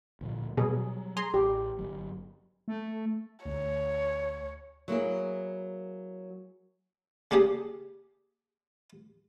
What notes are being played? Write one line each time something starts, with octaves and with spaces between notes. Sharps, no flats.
D2 A#2 F3
B2 F#3 G3 G#4
G#4 A#5 C6
A1 G4
G1 F#3
A3
D2 C#5
F#3 A#3 E4 G#4
C#3 A#3 D4 G4 G#4